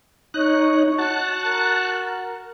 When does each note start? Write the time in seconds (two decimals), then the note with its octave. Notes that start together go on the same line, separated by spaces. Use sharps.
0.34 D#4 C#5 F#6
0.98 F#4 A5 F#6
1.44 A#4